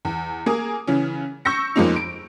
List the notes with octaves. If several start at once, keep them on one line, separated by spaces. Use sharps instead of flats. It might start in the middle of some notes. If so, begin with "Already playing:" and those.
E2
A#3 G#4 A#4 D#6
C#3 E3 C#4
C#6 E6 G6 A#6 C#7
F2 F3 G#3 A#3 C#4 D#4
D7